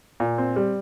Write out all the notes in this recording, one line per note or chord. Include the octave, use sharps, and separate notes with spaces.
A#2
C4
G3